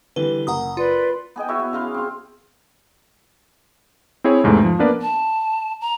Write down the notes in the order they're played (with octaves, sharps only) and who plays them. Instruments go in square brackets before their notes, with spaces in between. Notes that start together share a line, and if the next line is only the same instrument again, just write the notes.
[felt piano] D3 E3 G3 [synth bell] B4 G7
[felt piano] F#1 [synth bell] F#5 A#5 D#6
[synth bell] F4 [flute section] B4 D5 C6
[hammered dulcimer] B3 G#4 D#5 G5
E4 F#4 C#5 E5
B3
C#3 F5 C6
C4 F4
[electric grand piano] C4 E4 G#4 C#5
E2 G#2 C3 G#3 A3
F3
A#3 B3 D4 A#4 B4 D5
[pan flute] A5
A#5